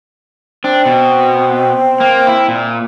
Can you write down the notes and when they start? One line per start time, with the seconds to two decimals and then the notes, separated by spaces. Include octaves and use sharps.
0.64 C4 D4
0.85 B2
2.00 A#3
2.27 E4
2.48 A#2